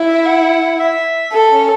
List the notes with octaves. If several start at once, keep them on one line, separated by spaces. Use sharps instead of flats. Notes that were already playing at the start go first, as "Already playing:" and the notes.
Already playing: E4
E5
F#5
E5
A4
C#4